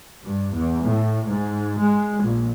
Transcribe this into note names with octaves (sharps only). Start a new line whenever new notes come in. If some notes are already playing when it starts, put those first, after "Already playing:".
G2
E2
A2
G#2
G#3
A#1